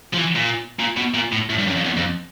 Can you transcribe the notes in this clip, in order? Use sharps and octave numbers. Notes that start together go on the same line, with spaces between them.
F3
E3
A#2
A#2
B2
A#2
A2
A2
G2
F#2
F2
E2
F2